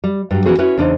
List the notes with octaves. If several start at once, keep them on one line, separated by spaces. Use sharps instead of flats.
G3
G2 F#3 G3
E3 A#3 B3 C#4 F#4 G#4
C#4 E4 F#4 B4
E2 C#3 D4 D#4 C5